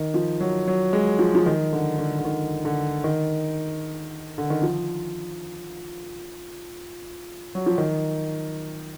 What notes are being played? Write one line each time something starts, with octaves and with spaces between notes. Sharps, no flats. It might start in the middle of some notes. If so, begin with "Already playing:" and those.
Already playing: D#3
F3
F#3
F#3
G#3
F3
F3
D#3
D3
D3
D3
D#3
D3
D#3
D3
D#3
F3
F#3
F3
D#3